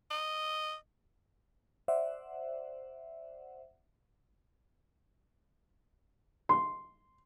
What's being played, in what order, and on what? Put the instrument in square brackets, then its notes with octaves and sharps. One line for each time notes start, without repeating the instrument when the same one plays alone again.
[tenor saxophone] D#5
[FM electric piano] C5 D5 E5 F#5
[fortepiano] C6